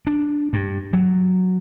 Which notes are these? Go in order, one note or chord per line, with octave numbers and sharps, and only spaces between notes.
D4
G2
F#3